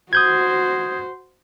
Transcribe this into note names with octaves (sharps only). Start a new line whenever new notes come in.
F#4 C5 D#6 G6 G#6